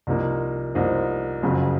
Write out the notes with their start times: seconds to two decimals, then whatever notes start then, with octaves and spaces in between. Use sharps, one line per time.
0.07 C2 C3 F3 A#3 D#4
0.75 C2 C3 F3 A#3 D#4
1.42 F#1 F2 C#3 F#3